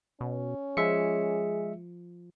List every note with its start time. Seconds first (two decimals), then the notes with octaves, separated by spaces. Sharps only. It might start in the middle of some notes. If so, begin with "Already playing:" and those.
0.21 B2 C#4
0.77 F3 G#3 G#4 E5 C#7